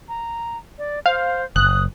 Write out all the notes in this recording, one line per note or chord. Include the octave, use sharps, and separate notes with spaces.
A#5
D5
C5 F5
F#1 D#6 F#6